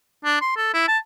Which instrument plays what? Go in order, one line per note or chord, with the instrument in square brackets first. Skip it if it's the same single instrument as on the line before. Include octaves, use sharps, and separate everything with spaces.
[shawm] D4
C6
A4
E4
A5